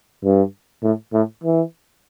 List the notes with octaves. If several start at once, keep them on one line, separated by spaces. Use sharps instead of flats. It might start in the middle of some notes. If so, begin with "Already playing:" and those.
G2
A2
A2
E3